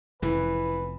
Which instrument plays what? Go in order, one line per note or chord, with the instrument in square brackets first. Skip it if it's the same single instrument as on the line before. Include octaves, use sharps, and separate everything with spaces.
[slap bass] F1 F2 C#3 [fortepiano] E3 [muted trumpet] B4